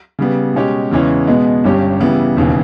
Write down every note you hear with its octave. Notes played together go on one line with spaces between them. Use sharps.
C#3 G3 B3
B2 G#3 C#4 G4
E2 C#3 E3 G#3 C#4
B2 G#3 B3
G1 G2 G3 C#4 G4
C#3 E3 G3 B3 E4
E1 D#2 C#3 E3